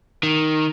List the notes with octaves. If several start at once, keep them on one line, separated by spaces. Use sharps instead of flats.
D#3